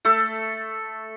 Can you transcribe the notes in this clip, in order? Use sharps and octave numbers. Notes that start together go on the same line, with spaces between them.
A3 A4